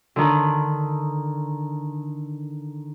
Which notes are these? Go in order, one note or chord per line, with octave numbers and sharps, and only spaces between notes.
D3 D#3